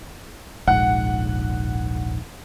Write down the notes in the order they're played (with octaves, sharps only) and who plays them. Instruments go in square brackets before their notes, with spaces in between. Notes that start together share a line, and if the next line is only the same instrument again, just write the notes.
[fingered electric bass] D#1 A#1 G#2 [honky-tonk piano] F#5